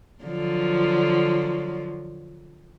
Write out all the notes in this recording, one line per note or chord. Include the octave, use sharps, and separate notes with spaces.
D3 F3 F#3